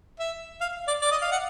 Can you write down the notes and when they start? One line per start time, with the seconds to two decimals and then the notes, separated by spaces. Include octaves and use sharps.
0.20 E5
0.61 F5
0.88 D5
1.02 D5
1.12 D#5
1.22 F5
1.32 F#5